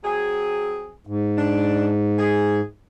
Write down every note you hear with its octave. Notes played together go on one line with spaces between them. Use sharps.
F#3 C4 G#4
G#2
D4
G#4